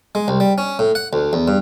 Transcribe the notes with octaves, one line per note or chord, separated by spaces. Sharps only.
G#3
C2
G3
C#4
A2
F#5
D2
E2
G2